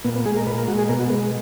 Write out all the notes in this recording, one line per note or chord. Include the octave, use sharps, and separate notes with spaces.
A#2 B3
B3
G#3 G#4
A#4
A#2 B4
A#4
G#3 F#4
G#4
B2 A#4
F#4
G#3 B3